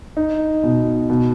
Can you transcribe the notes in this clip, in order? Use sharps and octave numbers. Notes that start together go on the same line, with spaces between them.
D#4
B2
B2